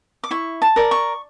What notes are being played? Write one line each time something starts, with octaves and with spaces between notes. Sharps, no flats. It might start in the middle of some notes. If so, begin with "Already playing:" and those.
D6
E4 C#6
A5
A#4 D5
C#6